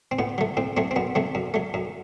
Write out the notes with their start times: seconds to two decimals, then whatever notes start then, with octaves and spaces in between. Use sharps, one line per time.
0.11 C4
0.19 A2 B3
0.38 F#3 A3
0.57 A2 C4
0.77 F#3 A3 C4
0.91 C4
0.96 F#2 B3
1.15 F#3 A3 C4
1.35 F#2
1.54 F#3 A3
1.74 F#2